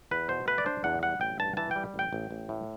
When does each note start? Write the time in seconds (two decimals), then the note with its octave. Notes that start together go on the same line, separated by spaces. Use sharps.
0.11 E2 B4
0.29 B2 C5
0.48 A3 B4
0.58 D5
0.66 D4 C5
0.84 E2 F#5
1.03 G3 F#5
1.21 A1 G5
1.39 G2 A5
1.57 E3 A5
1.71 G3 G5
1.94 A1 G5
2.13 A1
2.31 A1
2.49 A2